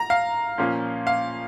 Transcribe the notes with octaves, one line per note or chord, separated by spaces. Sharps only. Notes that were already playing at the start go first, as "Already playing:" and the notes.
Already playing: A#5
F5
A#2 F3 A#3 C#4
F5